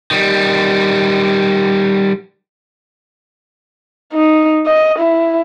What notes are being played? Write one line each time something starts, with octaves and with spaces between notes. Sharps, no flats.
D#3 G3
D#4
D#5
E4